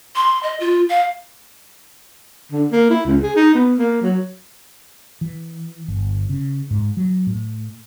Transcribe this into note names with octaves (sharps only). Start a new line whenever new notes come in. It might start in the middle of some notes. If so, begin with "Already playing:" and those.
C6
D#5
F4
F5
D3
A#3
E4
C#2
G#4
D#4
B3
A#3
F#3
E3
G1
C#3
G#2
F#3
A2